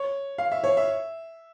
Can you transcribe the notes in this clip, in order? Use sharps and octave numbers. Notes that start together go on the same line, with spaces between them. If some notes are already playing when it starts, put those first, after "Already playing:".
Already playing: C#5
F5
E5
C#5
E5